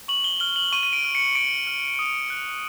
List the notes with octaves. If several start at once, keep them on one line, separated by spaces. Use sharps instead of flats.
C#6 F#7
G7
F6 G7
F#7
C#6 D#7
D#7
D7
F6
C#7
C#6 D7
F6
D#6
F#6